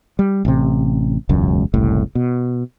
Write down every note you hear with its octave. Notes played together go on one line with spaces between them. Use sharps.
G3
A1 C3
E1 C#2 F#2
F#1 C2 A2
B2